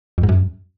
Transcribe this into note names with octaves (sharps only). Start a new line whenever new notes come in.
F2
G#2
F#2